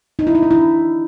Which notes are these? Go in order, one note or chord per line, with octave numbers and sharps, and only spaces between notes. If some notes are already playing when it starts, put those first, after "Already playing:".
D#4
E4
D#4
D4
E4